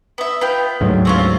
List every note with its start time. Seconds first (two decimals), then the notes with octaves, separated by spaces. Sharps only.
0.18 B3 E5
0.41 B3 F4 G5
0.81 D2 G#2 F#3
1.05 C4 C#4 F4